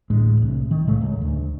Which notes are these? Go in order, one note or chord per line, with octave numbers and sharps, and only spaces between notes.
A1 D2 A2 G#3
C2
D#3
A2 C#3 G#3 A3
C#2
D2